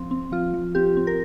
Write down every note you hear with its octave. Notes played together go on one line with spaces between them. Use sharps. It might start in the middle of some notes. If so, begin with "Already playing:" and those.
Already playing: F3 C4
C4
F3 F4
F3
C4 G4
C4
A#4